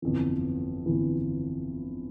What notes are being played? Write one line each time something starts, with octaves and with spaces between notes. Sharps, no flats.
G1 F2 E3
G1 F2 E3